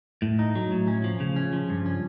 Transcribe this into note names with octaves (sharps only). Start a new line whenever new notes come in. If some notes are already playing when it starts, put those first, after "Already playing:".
A2
D#4
F#3
A2
C#4
F3
C#3
C#4
F3
G2
C#4